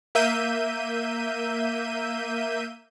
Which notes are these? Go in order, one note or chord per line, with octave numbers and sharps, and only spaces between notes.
A#3 E5 G6 D#7